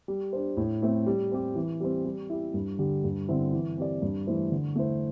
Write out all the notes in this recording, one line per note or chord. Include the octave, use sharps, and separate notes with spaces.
G3
D4 C5
A2
A3 C4 E4
G3
C4 G4
E3
G3 C4
G3
E4 G4
G2
D3 G3
G2
D3 C4 E4
E3
C4 G4 D5
G2
E3 A3 E4 C5
D3
A3 E4 C5